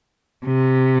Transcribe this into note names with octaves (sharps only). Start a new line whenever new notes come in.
C3